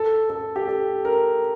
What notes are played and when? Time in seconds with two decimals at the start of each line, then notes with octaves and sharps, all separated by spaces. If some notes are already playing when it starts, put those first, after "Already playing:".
Already playing: A4
0.30 A4
0.56 G4
0.68 A4
1.05 A#4